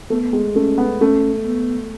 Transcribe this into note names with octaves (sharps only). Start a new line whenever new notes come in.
A3 B3
G#3
A3 C#4
B3
A3 C#4
B3